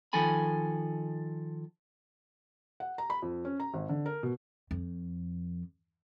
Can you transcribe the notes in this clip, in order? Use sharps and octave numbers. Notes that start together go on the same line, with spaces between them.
D#3 F3 A4 G#5 B5
F#5
A#5
B5
F2
C#4
A#5
G#1
D3
A#4
B2
F2